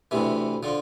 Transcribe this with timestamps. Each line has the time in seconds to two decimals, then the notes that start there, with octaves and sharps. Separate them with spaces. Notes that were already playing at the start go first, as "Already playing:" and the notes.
0.11 D2 C3 E3
0.63 D3 F3